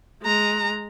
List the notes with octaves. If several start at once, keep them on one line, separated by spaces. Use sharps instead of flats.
G#3 A#5